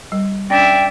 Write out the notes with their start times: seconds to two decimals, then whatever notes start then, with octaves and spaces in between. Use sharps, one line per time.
0.12 G3
0.50 C#4 D4 D5 E5 G5